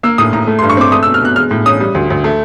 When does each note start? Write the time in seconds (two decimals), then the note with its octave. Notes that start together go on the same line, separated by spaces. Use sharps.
0.03 A#3 E6
0.18 A2 D#6
0.33 A2 A#5
0.47 A3
0.59 C6
0.62 G2
0.70 C#6
0.77 C4 D6
0.92 A3 D#6
1.03 E6
1.07 B2
1.14 F6
1.21 B2 F#6
1.36 G#3 F6
1.51 A2
1.66 C#4 D#6
1.80 G3
1.95 D2
2.10 D2
2.24 A3